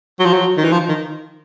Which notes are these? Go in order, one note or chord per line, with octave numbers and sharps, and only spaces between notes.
F#3
F3
F#3
D#3
E3
F3
D#3